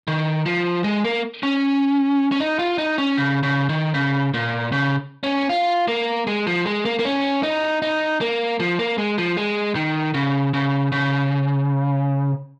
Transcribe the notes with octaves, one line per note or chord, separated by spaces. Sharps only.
D#3
F3
G#3
A#3
C#4
C#4
D#4
F4
D#4
C#4
C#3
C#3
D#3
C#3
A#2
C#3
C#4
F4
A#3
G#3
F3
G#3
A#3
A#3
C#4
D#4
D#4
A#3
F3
A#3
G#3
F3
G#3
D#3
C#3
C#3
C#3